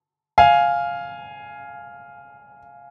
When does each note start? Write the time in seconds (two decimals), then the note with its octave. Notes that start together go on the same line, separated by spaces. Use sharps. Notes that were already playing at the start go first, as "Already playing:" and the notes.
0.38 F5 G#5